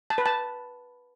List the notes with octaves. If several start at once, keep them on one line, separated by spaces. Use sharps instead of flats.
A5
B4
A5